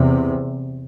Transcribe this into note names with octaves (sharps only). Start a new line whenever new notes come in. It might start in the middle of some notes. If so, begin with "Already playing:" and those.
Already playing: E2 C3